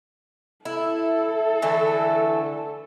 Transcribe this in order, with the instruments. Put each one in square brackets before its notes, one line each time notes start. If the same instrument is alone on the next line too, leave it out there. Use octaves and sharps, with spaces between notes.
[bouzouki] E4 [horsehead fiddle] A4
[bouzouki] D3 E3 A3